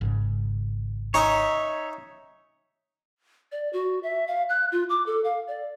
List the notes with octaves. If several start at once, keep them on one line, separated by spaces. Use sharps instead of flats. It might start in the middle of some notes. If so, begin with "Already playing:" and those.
G#1 G#2 C#3
C#4 D#4 C#5 E5
D5
F#4
E5
F5
F#6
F4
D6
A4
F5
D5